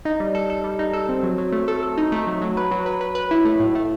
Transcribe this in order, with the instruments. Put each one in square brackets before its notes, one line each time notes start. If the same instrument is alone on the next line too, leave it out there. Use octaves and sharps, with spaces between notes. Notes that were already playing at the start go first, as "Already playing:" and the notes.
[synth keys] D#4
G3
A4
A4
G3
D#4
A4
C4
F#3
F#3
A3
A4
A4
D#4
A3
F#3
F#3
B4
F#3
B4
B4
B4
E4
A3
A2
A3